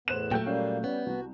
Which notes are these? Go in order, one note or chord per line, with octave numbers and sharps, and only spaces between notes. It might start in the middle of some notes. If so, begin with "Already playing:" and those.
E2 A2 B3 C5 F#6 E7
A#2 F#3 A3 G5 G6
G3 A#3 C#4 F5
G3 B3 C#4
C2 F#4